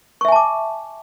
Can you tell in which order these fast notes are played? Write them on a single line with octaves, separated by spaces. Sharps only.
C#6 E5 G#5 A5 D6